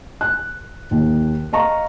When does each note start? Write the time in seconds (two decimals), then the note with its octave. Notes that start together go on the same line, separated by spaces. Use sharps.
0.21 F#6
0.91 D#2
1.53 D#5 F5 A#5 C#6